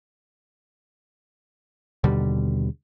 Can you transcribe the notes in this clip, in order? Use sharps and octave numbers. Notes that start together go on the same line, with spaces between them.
D#2 B2 D3 G3